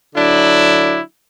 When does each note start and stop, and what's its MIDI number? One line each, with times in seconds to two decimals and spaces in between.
0.15 0.99 50
0.15 0.99 54
0.15 0.99 62
0.15 0.99 64